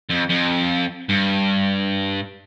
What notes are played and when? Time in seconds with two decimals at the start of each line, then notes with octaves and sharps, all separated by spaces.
0.10 F2
0.30 F2
1.09 G2